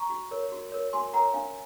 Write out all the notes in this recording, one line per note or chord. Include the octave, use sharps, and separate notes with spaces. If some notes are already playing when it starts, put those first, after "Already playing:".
Already playing: A#5 C#6
F#4
A#4 C#5
F#4
A#4 C#5
F#4 G#5 C6
A#4 C#5 F#5 A#5
C#4 F5 G#5